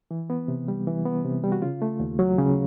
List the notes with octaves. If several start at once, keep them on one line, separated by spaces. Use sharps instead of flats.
E3
B3
C3
G3
E3
B3
C3
G3
F#4
C#3 F4
A3
D#2
F#3
C#3